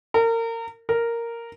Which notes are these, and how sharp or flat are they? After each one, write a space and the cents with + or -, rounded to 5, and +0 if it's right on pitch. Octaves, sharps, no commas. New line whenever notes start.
A#4 -30
A#4 -5